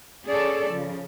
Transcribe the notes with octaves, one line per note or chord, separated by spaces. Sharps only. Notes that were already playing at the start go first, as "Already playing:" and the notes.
C#4 G#4 A4 C#5 D5
C#3 F3